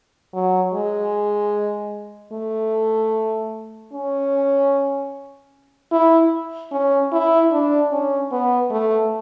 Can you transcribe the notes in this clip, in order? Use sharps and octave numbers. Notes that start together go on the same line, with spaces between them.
F#3
G#3
A3
C#4
E4
C#4
E4
D4
C#4
B3
A3